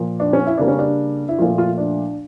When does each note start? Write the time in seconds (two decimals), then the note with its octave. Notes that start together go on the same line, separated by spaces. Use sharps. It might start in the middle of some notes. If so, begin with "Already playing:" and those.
Already playing: A#2 F3 A#3
0.20 D4
0.33 C#4
0.47 E4
0.58 C#3 G3 A#3 D4
0.68 C#4
0.79 D4
1.29 E4
1.38 A#2 F3 A3 F4
1.58 F4
1.78 D4